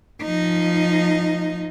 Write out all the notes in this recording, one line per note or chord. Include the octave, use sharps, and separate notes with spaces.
F3 D#4